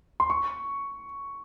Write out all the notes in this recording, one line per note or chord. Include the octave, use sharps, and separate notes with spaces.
C6
C#6